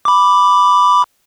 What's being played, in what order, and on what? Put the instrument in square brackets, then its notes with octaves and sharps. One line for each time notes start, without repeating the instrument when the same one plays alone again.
[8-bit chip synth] B5 D6